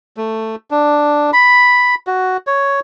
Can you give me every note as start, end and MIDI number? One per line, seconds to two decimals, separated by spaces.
0.17 0.55 57
0.71 1.31 62
1.33 1.95 83
2.07 2.37 66
2.47 2.80 73